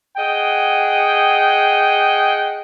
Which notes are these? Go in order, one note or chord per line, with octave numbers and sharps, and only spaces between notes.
G#4 D#5 F#5 G5